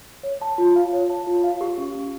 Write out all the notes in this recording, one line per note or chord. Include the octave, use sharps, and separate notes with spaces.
C#5
A5
F4
F5
C#5
A5
F4
F5
G4
C#4
C#4